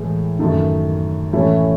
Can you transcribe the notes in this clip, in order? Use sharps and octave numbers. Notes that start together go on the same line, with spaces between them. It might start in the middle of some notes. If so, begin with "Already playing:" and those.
Already playing: A2 E3 G#3
F#2 D#3 A3 D#4
A2 E3 A3 C#4 E4